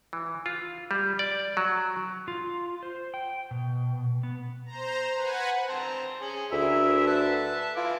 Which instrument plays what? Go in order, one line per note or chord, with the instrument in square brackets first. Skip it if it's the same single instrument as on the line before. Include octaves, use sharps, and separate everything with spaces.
[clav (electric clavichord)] E3
F4
G3
D5
F#3
[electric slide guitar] F4
C5
G5
B2
B3
[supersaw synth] C5 A#5
B4 F#5 G#5
[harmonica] C4 A5 A#5 [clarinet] C6
[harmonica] C#4 G#4
[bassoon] D2 [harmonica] E4 G#4 A#4 [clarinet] E5
[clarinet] B4 [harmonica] E5 A5
[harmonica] E4 G#5 D6 [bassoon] F4